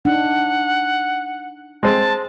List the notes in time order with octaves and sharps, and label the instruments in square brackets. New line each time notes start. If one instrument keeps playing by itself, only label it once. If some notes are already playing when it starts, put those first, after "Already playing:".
[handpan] D4 D#4 [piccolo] F#5
[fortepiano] G#3 C4 [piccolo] A5